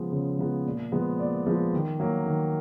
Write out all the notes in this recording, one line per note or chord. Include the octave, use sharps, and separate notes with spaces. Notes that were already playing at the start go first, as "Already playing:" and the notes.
Already playing: C#3 F3 G#3 B3
C#3
F3 G#3 B3
A#2
F3 G#3 B3
A#2 D5
F3 G#3 B3
D#3
F#3 A#3
D#3